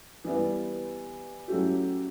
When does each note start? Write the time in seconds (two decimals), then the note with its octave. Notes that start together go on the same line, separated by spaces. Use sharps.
0.24 E3 G3 B3
1.48 F#3 A3 C#4 E4 G4